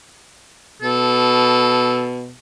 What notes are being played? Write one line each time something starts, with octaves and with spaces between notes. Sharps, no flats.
B2 A4